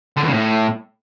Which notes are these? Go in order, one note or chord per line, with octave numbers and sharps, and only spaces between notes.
D3
E2
C#3
A2